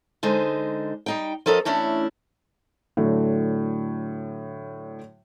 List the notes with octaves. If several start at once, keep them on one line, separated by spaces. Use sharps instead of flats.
D3 G#3 D#4 C5
G3 D#4 G5
F3 C#4 A4 A#4 D#5
E3 A3 C#4 D4 E4
A2 D3 F#3 A3